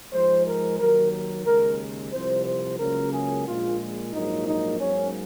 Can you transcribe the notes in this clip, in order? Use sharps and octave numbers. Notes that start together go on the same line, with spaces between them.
G#2 F3 G#3 C5
A#4
D#2 D#3 F#3 A#4
A#4
D#2 C#3 G#3 A#4
C2 C3 F3 C5
C5
C#2 C#3 F#3 A#3 A#4
G#4
A#1 A#2 G#3 F4
A#1 G#2 F#3 A#3 D#4
D#4
G#2 F#3 A#3 C#4